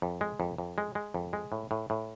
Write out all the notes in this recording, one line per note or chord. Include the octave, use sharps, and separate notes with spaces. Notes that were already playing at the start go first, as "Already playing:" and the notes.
F2
G#3
F2
F2
G#3
G#3
F2
G#3
A2
A2
A2